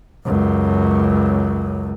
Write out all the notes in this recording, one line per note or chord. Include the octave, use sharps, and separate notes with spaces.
C#2 F#2